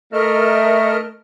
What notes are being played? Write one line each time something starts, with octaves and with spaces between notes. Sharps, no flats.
A3 A#4 D#5 F6